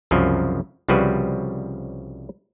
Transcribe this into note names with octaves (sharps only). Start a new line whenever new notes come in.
C2 F#2 C#3 F3
C2 C#3 F3 G3 F#4 B4